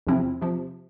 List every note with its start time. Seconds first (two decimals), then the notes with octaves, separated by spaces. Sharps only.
0.07 E2 C3 F3 C4 E4
0.41 C3 F3